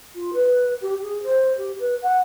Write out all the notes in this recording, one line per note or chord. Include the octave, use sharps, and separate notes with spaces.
F4
B4
G4
G#4
C5
G4
B4
F#5